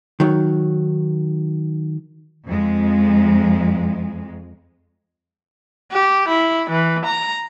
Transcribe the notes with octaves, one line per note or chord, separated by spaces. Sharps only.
D#3 F#3
F2 G#3
G4
E4
E3
A#5